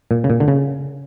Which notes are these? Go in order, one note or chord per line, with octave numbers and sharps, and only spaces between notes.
A#2
C#3
A#2
D3
C#3